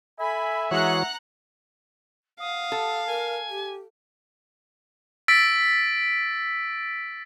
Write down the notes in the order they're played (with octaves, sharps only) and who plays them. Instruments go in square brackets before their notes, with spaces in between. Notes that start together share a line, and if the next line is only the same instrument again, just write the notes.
[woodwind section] A4 G#5 B5 [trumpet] E5
[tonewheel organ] E3 F#4 C#5 [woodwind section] G#3 G#4 [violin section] F#5 A#5 F#6
[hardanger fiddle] F5 [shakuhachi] F#5 [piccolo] D#6
[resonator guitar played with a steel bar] A4
[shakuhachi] A#4 [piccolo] G#5
[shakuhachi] G4
[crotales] E6 A6 B6 D7